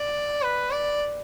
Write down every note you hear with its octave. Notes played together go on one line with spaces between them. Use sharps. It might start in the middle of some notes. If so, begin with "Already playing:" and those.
Already playing: D5
B4
D5